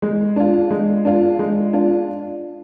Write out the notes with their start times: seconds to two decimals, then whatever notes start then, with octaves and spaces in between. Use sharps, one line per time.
0.02 G#3
0.36 D4 F4
0.71 G#3
1.05 D4 F4
1.39 G#3
1.73 D4 F4